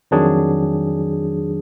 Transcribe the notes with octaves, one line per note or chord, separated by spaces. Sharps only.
F2 D#3 F#3 D4 G#4